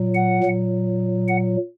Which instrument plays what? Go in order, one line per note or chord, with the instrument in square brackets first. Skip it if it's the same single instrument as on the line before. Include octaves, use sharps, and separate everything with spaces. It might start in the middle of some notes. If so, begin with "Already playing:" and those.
Already playing: [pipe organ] A#2 F#3
F#5
A#2 F#3
F#5